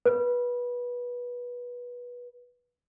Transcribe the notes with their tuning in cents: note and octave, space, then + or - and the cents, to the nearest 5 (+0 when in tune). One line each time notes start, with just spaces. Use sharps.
B4 -20